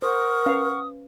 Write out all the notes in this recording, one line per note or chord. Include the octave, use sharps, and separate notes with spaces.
A#4 C5 F#5 C#6 D#6 F6
C#4 B4 F5